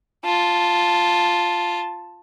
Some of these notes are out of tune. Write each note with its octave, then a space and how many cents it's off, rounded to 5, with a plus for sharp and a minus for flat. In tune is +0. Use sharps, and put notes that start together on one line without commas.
F4 +0 A5 +0